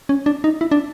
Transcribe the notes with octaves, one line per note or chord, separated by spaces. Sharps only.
C#4
D4
D#4
E4
D4